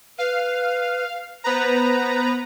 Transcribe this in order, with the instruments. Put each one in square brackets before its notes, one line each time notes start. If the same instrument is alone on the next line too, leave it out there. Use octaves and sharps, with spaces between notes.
[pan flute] B4 [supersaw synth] F5
[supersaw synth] B3 B4 A#5 [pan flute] C5